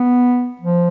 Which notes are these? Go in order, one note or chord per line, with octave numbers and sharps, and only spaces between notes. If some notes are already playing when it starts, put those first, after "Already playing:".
Already playing: B3
F3